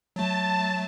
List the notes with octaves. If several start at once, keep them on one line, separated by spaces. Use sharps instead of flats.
F#3 A3 A5